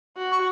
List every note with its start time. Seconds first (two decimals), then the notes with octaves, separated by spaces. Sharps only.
0.17 F#4
0.32 C#6